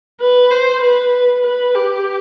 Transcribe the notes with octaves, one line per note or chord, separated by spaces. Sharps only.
B4
C5
B4
B4
G4